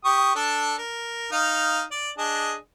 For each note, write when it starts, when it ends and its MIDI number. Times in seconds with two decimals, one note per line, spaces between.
0.05 0.32 67
0.05 0.32 85
0.05 0.32 87
0.36 0.75 62
0.36 0.75 69
0.78 1.32 70
1.32 1.82 63
1.32 1.82 77
1.91 2.10 74
2.18 2.55 62
2.18 2.55 68
2.18 2.55 75